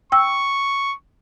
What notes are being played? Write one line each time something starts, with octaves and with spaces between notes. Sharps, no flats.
G5 C#6 E6